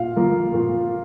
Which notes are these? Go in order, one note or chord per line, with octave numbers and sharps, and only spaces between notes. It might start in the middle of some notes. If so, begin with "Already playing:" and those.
Already playing: A#2 F5
F3 A#3
A#2